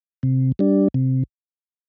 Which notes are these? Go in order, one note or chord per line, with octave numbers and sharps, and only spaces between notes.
C3
G3 D4
C3